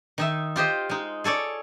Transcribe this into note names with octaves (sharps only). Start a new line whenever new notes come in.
D#3 D#4 E5
F4 G4 C5 D#5
G#3 D#4
G#4 A4 C#5 D5